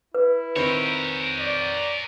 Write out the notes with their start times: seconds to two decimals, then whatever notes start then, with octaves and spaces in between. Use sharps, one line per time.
0.15 E4 B4
0.56 D#3 C4 A#4 C#5 B5
1.39 D5